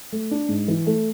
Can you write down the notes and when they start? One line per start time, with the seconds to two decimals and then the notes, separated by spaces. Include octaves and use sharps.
0.12 A3
0.31 D4
0.49 G#2
0.68 E3
0.87 A3